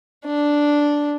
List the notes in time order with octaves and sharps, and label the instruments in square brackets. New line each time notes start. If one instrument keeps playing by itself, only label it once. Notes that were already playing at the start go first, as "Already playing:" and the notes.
[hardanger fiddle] D4